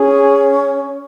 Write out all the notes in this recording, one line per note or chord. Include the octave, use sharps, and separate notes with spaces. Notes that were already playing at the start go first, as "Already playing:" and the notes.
Already playing: C#4 G#4